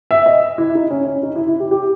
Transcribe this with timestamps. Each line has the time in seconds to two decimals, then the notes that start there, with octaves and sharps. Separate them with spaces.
0.11 E5
0.26 D#5
0.58 E4
0.75 D#4
0.91 C#4
1.07 C#4
1.23 D#4
1.36 E4
1.47 E4
1.60 G4
1.71 G4